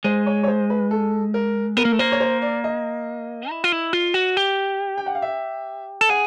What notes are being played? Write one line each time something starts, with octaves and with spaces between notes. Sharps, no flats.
G#3 C5
C#5
C#5
C5
B4
A4
A#4
B3 A#4
A#3
A3
A#3 C5
C#5
C5
D5
D#5
E4
F4
E4
F4
F#4
G4
G5
F#5
F5
E5
A4
G#4 F#5